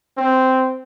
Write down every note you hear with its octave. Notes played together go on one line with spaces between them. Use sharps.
C4